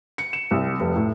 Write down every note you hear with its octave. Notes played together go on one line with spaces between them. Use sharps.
C#7
E7
C2
F1
A2